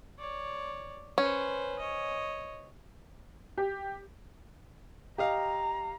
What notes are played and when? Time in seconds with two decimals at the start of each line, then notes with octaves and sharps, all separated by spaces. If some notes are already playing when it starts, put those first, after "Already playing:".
0.19 C#5 D5
1.18 C#4 B4 C5
1.79 C#5 D#5
3.57 G4
5.18 G4 D#5 F5 A#5